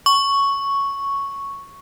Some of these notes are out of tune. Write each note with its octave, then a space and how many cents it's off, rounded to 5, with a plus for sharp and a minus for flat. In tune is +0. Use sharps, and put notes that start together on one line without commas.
C#6 +0